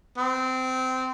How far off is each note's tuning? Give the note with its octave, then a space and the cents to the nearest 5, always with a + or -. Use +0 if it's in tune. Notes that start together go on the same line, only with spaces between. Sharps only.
C4 -20